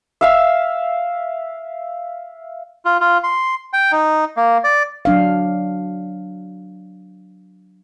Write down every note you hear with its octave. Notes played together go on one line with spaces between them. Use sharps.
E5 F5 E6
F4
F4
C6
G5
D#4
A#3
D5
F#3 D4 F5